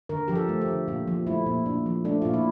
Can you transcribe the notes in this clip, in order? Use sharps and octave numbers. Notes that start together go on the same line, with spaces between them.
D3 A#4
F3 G4
A4
A3
G4
D3
A#2 F4
F3
A3 E4
A#2
A#2 D4
F3
A3 D4
A#2 F4
E4